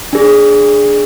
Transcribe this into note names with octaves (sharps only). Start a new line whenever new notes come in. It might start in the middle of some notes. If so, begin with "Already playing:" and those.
D4 G#4